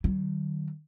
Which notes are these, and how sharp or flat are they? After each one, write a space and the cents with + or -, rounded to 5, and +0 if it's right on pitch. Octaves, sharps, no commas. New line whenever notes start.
D#3 -35 F#3 +40